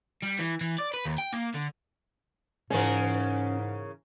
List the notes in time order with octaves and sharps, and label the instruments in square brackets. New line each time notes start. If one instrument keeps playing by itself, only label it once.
[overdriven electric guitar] G3
E3
E3
D5
B4
D#2
G5
A#3
D3
[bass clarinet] G#2 [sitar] C#3 E3 A#4 [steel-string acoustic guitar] C#4